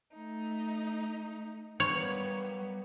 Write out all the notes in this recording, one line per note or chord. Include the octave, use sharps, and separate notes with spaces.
A3 D#4
G3 A#3 B3 C#5